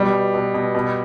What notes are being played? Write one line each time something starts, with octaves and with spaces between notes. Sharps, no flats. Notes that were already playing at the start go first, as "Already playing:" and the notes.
Already playing: B2 G3
B2
B2
B2
B2